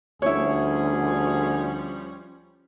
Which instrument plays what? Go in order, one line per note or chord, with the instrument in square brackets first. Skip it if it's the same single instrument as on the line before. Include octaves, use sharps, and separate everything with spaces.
[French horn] D2 [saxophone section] F3 G3 C#4 [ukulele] E4 C#5 [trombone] G#4